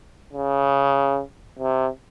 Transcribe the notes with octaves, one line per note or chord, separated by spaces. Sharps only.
C#3
C3